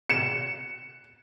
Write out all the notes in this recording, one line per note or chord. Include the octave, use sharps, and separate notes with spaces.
C#7 E7